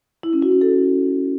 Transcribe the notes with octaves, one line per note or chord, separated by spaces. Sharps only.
E4
C#4
F#4
C#4
A4